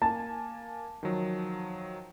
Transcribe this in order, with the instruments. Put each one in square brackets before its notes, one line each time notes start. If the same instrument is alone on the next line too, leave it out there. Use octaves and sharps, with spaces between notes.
[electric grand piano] A#3 G#5 A6 [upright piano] A5
[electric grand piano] D#3 F3 F#3